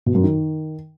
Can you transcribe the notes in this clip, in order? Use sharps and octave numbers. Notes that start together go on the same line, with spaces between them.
B2
F#2
D#3